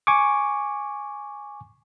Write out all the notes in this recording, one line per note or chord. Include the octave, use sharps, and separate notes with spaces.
G#5 C#6 D6